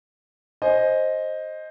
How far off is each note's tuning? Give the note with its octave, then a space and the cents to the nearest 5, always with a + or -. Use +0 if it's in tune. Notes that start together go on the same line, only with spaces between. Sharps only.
C5 +10 D#5 +0 G#5 +10